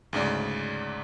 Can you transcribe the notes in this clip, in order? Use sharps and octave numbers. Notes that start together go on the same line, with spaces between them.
D2 G#2 C#3 D5